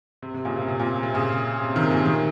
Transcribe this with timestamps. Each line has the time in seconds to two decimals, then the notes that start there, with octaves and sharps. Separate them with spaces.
0.22 C3
0.34 C3
0.45 A#2 C#3
0.56 C3
0.68 C3
0.80 A#2
1.03 C3
1.14 A#2 C#3
1.60 C3
1.76 C3 D#3
1.91 A#2 C#3
2.06 C3 D#3